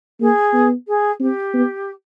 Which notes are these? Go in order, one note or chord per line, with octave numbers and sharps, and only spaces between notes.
A#3 G#4
B3
G#4
C4 G4
B3